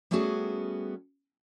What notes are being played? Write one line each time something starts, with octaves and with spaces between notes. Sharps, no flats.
G3 A3 B3 C#4 F#4 G#4